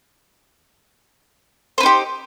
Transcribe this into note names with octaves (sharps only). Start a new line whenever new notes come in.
D#4 G4 B4 C5